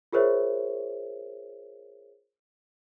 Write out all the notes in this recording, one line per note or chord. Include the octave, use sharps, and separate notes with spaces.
F4 G#4 A#4 C5 C#5 E5